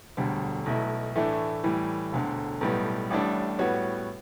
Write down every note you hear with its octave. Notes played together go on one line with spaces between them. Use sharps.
E1 D2 D3 G3
B1 B2 A3 E4
A2 E3 A3 D4
A2 E3 G3
E1 D2 D3
B1 A2 G3 B3
A1 A2 G3 D4
A2 G3 B3 F#4 C#5